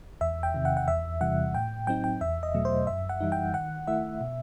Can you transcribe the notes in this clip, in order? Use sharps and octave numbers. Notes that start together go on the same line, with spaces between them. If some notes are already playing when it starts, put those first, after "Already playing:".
E2 E5
G5
C3 D#3
F#5
F#5
E2 E5
C3 E3 G3 F#5
A2 G5
F#3 C4 D#4 G5
G5
E2 E5
D#5
B2 F#3 A3
C5
F#2 E5
F#5
E3 G3 D#4
G5
D#3 F#5
A3 E4 E5
B2